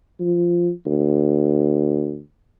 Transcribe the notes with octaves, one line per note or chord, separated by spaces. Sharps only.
F3
D2